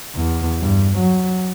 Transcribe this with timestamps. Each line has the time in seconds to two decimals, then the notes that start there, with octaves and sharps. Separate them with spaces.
0.15 E2
0.60 G2
0.98 F#3